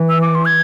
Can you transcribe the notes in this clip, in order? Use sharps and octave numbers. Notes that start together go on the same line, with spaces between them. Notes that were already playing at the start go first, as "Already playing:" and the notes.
Already playing: E3
E6
D6
C6
G#6